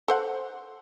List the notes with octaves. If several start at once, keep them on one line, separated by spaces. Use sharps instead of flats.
A4 C5 F#5